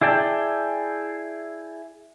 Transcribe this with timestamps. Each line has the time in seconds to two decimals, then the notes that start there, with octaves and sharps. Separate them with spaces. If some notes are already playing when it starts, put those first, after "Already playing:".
0.01 E4 G#4 D5 G5 A5